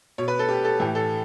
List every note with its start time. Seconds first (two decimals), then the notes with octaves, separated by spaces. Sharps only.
0.18 B2 C#5
0.28 B4
0.39 A4
0.48 G4
0.64 A4
0.80 A2 E3 G4
0.95 A4